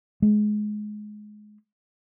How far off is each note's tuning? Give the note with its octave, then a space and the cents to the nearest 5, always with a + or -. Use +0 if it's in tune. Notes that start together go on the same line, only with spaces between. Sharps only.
G#3 +20